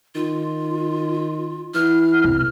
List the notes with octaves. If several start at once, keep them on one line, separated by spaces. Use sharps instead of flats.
D#3 F4
E3 F6
C3